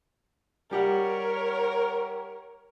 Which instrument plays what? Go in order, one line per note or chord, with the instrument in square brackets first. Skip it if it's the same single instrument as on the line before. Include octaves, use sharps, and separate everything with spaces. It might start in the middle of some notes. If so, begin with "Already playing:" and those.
[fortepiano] G3 G4 F#5 [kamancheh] A#4 C#5